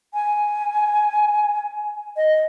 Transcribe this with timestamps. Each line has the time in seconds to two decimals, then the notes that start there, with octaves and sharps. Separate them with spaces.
0.14 G#5
2.17 D#5